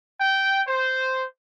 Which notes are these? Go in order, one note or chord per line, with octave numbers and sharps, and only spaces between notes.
G5
C5